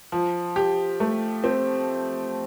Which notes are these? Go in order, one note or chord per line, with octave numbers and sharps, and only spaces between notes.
F3
G4
A3
C4